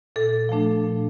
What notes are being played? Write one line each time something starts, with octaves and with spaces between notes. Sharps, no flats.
A#2 A4
F3 A3 D4
A#2